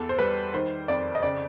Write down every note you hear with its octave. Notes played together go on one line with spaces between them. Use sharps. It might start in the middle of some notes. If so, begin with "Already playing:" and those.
Already playing: E2 A4
C5
G3 B4
D#3 C5
F2 D5
D#5
C#3 D5